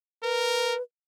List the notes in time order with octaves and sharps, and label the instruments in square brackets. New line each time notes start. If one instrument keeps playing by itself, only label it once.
[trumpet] A#4 [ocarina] B4